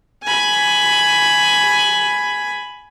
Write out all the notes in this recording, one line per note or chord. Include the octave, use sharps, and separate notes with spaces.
G#5 B5